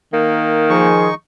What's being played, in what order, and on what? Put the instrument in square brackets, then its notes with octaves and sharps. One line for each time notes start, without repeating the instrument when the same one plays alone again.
[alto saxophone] D#3 [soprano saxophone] A#3
[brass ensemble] F3 G#4 C5 [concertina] D#4 C#6